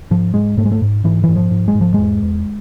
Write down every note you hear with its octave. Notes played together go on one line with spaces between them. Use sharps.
G#2 F3
G#2 G#3
G#2 A3
G#3
A3
G#2
G#2 E3
G#2 E3
F3
G#2
G#3
G#2
F3
E2 G#3
E2